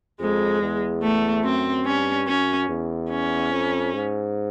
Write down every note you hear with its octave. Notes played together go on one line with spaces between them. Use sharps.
F2 G#3
E2
A3
F#2 C4
G2 C#4
F#2 C#4
E2
C#4
F2
G#2